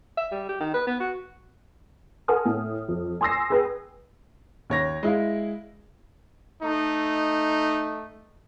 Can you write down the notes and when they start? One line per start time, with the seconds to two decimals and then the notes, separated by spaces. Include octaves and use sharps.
0.18 E5
0.32 G3
0.49 G4
0.61 D#3
0.74 B4
0.87 B3
1.00 F#4
2.28 A4 A#4 F#5 G#5 D#6 F6
2.45 A2
2.88 F2
3.21 G#5 C6 D#6 E6 A#6 C7
3.50 G#4 B4 G5
4.70 D#2 C#5 A#6
5.03 G#3 E4 F5
6.63 A3 D#4